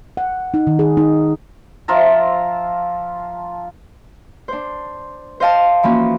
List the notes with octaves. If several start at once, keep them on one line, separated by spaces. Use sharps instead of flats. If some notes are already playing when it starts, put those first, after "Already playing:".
F#5
D#4
D#3
G#4
D#4
F3 F4 E5 A#5
D4 C5
C5 D#5 F5 A5
E3 F3 A#3 C#4 F#4